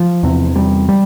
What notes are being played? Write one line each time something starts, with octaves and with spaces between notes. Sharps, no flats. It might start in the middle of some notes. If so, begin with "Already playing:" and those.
Already playing: F3
E2 C3
G3
G3